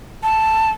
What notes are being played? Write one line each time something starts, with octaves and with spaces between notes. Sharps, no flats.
A5